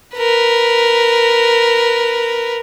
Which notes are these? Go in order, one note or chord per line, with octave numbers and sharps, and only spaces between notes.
A#4 B4